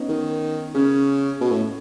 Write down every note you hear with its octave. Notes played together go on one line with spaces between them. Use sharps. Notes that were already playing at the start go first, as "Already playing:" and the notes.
Already playing: B3 C#4 D#4
D#3
C#3 C#4
B2
A2